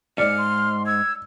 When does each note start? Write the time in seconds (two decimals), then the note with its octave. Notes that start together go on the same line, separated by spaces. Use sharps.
0.18 D2 G#2 D5 F6 C#7
0.38 C6
0.86 E6 G#6